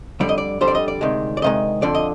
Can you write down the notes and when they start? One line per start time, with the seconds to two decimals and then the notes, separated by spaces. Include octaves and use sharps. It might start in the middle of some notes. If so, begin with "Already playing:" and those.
0.20 F2 D3 G3 D5
0.29 D#5
0.38 D5
0.61 F2 D3 G3 C5
0.68 D5
0.75 D#5
0.88 D5
1.01 D2 C3 D#3 G#3
1.37 D5
1.42 D2 C3 D#3 G#3 D#5
1.82 F2 D3 F3 D5
1.95 D#5